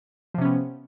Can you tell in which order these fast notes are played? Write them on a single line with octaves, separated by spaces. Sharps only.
F3 C3 C#4 B3